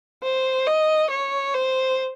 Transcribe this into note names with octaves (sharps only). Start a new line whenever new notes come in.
C5
D#5
C#5
C5